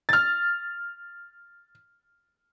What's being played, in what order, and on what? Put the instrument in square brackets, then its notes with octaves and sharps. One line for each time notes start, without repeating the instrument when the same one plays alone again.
[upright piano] F6 A6